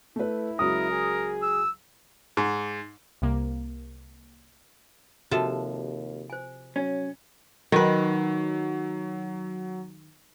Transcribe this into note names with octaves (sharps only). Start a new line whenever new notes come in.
A3 E4 B4
C#2 F#3 A#4 D#6
G#4
E6
G#2
C2 C3 A#3
D#2 C3 F3 F#4 A4
C5 G#5
F#3 C#4
D#3 F#3 B4